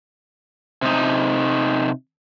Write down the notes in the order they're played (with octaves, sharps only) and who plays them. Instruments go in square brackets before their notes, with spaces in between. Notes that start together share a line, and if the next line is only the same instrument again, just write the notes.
[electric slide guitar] C3 D#4